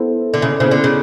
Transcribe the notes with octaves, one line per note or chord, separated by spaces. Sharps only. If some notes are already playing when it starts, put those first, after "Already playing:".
Already playing: B3 E4 A4 C5
D3
C#3
C#3 B3 E4 A4 C5
D3
C#3